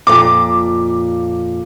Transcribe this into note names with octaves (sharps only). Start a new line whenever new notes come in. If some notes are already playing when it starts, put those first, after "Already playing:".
F2 A#2 D6